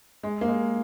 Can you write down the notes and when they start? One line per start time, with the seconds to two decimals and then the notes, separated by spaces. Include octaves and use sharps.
0.23 G#3
0.41 A#3
0.48 G#3